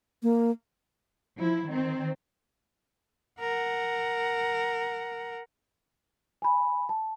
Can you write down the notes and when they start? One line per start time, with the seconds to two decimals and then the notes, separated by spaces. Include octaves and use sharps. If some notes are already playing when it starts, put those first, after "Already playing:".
0.23 A#3
1.37 F3 E4
1.68 D#3 C4
3.40 A#4 F#5
6.42 G#5 B5
6.89 A5